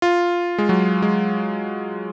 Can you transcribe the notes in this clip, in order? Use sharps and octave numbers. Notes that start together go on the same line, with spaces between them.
F4
G#3
F#3
G#3